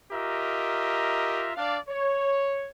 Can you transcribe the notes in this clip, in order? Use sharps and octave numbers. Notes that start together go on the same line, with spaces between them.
F4 G4 A#4 D#5 E5 A#5
D4 D5 F5
C#5